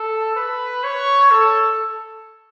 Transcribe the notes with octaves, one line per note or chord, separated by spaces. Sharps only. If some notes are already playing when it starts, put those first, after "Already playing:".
Already playing: A4
B4
C#5
A4